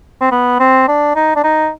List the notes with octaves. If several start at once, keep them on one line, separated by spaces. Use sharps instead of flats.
C4
B3
C4
D4
D#4
D4
D#4